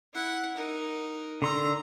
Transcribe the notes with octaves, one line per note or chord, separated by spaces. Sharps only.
E4 F#5
D#4 A#4
D3 A#5 C6 E6